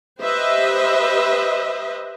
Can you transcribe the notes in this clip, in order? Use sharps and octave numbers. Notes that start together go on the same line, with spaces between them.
G4 B4 C5 D#5 E5